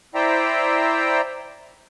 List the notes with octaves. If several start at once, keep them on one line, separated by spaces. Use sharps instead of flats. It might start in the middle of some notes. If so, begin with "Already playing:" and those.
E4 C5 D5 E5 G5 A#5